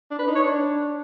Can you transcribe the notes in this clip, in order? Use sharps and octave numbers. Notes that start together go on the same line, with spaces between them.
D4
B4
D#4
C#5
D4